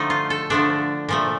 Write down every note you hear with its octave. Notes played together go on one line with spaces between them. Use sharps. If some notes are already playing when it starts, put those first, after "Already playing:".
Already playing: D3 F3 A3 D#4
F4
A4
D3 F3 A3 D4
A#2 F3 A3